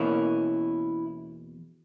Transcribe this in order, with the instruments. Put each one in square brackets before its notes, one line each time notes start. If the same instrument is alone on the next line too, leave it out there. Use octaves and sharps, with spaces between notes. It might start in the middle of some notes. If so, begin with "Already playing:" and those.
Already playing: [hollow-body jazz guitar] E2 B2 A#3 C#4 E4